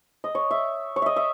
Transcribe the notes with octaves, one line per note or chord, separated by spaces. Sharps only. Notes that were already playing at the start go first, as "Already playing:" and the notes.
D#5
C#5
E5
C#5
D#5 E5
E5